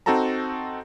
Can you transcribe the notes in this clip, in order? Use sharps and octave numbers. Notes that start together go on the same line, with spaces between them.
C4 D#4 F#4 A4 A5 A#5